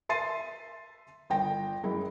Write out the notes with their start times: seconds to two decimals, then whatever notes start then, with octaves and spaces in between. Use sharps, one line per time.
0.09 E5 C6 A6 C7 D#7
1.30 G1 G5 A#6
1.83 F#2 G#3 E4